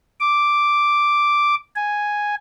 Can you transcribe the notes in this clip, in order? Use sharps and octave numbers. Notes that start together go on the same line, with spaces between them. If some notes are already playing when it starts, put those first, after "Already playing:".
D6
G#5